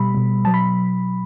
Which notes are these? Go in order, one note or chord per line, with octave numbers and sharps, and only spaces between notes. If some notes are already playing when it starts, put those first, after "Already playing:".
Already playing: B2 G3 B5
B2 G3
B2 F#3 A5
B5